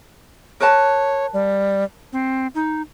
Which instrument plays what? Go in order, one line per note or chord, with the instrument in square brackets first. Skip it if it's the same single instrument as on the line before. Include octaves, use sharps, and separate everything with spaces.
[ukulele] A#4 B4 A5 [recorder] C#5
[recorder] G3
C4
D#4